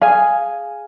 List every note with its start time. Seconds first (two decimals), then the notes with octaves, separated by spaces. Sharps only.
0.01 G#4 F5 G#5